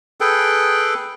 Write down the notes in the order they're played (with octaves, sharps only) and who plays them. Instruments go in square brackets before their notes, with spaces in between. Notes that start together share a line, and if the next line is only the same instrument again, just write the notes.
[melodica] G#4 A4 B4 G5